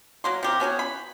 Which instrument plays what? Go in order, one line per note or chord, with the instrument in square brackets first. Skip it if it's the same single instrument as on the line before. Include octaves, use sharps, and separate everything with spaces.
[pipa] F#3 A#3 C6
C3 G4 A#4
B3 C#4 F#4 G#4
B5